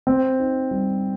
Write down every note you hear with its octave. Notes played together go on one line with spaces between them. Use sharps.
C4
D#4
G3